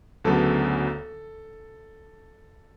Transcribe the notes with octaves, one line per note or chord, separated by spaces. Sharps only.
D2 C#3 F#3 B3 A4